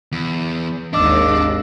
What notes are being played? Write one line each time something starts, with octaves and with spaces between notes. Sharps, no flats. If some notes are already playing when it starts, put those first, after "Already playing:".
E2
G#1 D#2 G#2 D4 D#5 D6 E6